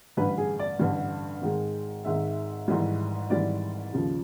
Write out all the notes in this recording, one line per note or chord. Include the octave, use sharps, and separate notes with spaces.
A1 G2 D3 G3 B4
G#4
D5
A1 G2 D3 G3
G#1 G#2 D#3 G#3
G#1 G#2 D#3 G#3 E5
G#1 G#2 E3 G3
G#1 G#2 E3 G3 D5
D#2 C#3 F3